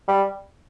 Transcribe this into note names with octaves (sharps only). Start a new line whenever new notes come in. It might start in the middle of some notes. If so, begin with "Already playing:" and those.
G3